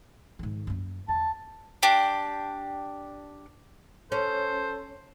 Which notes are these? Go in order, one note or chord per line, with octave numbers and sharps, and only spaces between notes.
G#2 D#3
F#2 A#3
E2 A5
D4 G4
C#4 A4 C5